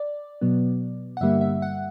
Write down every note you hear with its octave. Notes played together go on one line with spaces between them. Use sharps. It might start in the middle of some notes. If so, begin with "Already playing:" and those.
Already playing: D5
B2 F#3 B3
F#5
G2 D3 G3 A#3 E5
E5
F#5